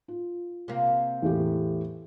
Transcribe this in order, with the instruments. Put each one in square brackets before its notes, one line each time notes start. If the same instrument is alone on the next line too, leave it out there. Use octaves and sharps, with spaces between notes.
[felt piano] F4
[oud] C3 A#3
[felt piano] E2 A2 G4